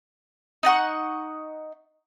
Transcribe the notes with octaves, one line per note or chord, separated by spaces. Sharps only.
D#4 D#5 F#5 C#6